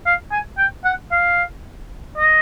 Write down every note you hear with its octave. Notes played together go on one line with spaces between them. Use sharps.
F5
G#5
G5
F#5
F5
D#5